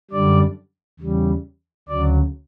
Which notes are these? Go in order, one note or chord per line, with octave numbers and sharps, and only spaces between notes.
F#2 D3 G3 D5
E2 C#3 G3
D2 C#3 F#3 D5